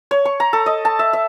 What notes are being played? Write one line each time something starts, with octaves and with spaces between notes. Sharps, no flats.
C#5
C#6
A#5
A4
D#5
A5
E5
E5